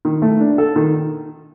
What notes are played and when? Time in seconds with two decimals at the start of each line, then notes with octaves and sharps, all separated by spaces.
0.05 D#3
0.22 A3
0.40 D4
0.58 A4
0.76 D#3